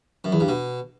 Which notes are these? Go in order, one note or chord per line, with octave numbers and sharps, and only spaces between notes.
F#2
E2
G2
B2